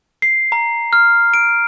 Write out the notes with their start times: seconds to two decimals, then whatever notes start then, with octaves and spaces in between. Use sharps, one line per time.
0.22 C7
0.52 A#5
0.93 F6
1.34 D7